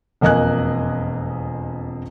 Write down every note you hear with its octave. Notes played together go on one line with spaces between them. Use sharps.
E1 F2 A#3 D#5 G#5 F#6